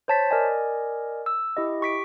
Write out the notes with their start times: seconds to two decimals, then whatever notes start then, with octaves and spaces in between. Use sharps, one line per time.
0.08 C5 C#5 A5 A6 B6
0.31 A#4 D5 D#5 G#5
1.26 E6
1.57 E4 G4 D#5
1.81 G4 C#6 B6 D7